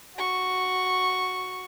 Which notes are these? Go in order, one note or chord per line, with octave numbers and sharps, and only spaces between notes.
F#4 C#6